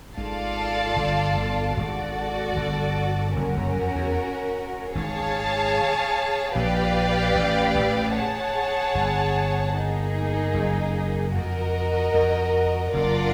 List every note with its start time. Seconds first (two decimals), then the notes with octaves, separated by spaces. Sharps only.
0.17 G#1 G#2 F4 A4 D5 F5 A5
0.96 G1 G2
1.37 G1 G2
1.76 G#1 G#2 F#4 A4 D5
2.56 G1 G2
3.36 F#1 F#2 C#4 F#4 A#4
3.56 F#1 F#2
3.76 F2
3.96 E2
4.95 G#1 G#2 G#4 C#5 F5 A5
6.55 A#1 A#2 G4 B4 D5 F5
7.35 A1 A2
7.74 A1 A2
8.15 G#4 C#5 F#5 A5
8.95 G1 G2
9.75 A#3 D#4 G#4
10.54 F#1 F#2
11.34 F2 F#4 A#4 D#5
12.14 F2
12.94 F#1 F#2 D4 F4 A#4 D5 F#5